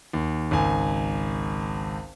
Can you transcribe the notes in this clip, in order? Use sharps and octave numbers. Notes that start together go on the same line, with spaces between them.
D#2
G#1 C#2 G#5